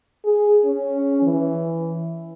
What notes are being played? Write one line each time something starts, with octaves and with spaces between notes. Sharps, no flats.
G#4
C#4
E3